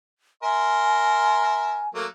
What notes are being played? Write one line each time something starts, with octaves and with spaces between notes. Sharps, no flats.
A#4 E5 G#5 C6
F#3 A3 A#3